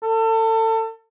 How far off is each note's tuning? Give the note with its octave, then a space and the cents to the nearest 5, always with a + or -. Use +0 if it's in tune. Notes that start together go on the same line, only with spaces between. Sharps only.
A4 +30